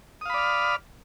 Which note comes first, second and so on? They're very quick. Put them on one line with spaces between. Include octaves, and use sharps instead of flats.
D#6 F5 B5 D5 F6